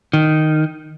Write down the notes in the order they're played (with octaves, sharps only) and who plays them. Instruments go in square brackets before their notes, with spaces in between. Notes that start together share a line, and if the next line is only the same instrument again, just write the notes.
[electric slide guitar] D#3